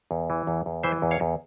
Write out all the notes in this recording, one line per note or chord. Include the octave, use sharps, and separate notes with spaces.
E2
E3
E2
E2
E3 C5 E5
E2
C#5 F5
E2